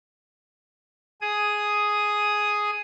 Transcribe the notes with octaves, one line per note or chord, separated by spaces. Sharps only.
G#4 D#6